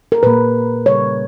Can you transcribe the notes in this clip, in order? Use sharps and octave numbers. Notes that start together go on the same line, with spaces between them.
A#4
A#2 A#3 B4
C#3 G3 A#3 C#5